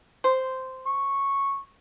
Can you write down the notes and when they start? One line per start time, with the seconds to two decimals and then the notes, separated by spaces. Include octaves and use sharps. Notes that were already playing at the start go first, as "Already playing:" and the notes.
0.24 C5
0.86 C#6